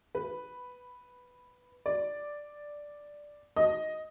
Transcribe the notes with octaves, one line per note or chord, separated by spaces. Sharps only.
B4
D5
D#5